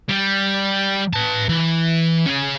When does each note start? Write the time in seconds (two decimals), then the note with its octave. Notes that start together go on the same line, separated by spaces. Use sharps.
0.09 G3
1.13 B4 A5
1.49 E3
2.26 C#4 G#4